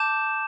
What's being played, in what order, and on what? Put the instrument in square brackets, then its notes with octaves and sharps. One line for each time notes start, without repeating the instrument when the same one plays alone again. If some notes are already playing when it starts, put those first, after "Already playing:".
Already playing: [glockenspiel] A5 D6 G6 E7